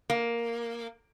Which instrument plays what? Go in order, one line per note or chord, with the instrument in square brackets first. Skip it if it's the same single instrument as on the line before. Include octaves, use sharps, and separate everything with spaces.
[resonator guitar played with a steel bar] A#3